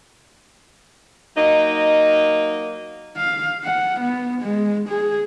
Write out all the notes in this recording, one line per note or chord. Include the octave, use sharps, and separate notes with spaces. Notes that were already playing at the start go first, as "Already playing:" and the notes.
F#3 A#3 D#4 D#5
F5
F#5
B3
G#3
G#4